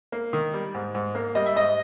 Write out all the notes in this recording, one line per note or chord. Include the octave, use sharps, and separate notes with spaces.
A#3
D#3
G3
G#2
G#2
A#3
G3 D#5
E5
G#2 D#5